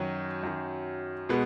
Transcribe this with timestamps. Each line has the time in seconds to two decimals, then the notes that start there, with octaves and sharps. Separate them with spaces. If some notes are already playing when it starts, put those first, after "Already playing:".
Already playing: F#2 D#3 F#3
0.43 F#2 D#3 F#3
1.29 B2 G#3 B3